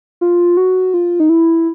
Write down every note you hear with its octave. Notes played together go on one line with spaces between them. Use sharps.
F4
F#4
F4
D#4
E4